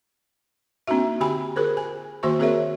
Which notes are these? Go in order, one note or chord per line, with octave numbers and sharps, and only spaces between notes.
A#3 C4 D4 D#4 F#4 E5
D3 F#4 G4 G5 G#5 B5
F4 G#4 A#4 C5
G#5
D#3 A#3 F#4 C5 E5 C#6
C4 F#4 G#4 A#4 C#5 E5